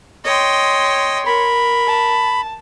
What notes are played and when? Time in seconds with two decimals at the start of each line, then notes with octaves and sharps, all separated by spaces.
0.24 C#5 D#5 G5 C6
1.26 A#4 B5
1.87 A5